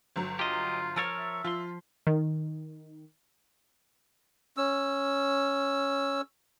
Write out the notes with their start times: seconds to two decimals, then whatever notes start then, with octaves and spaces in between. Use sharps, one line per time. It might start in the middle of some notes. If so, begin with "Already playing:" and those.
0.16 G1 F#3
0.39 F4 G4 D#5
0.96 F3 A#4 C#5 E6 F6 A6
1.19 E5
1.44 F3 F4 C6
2.07 D#3
4.57 C#4 E6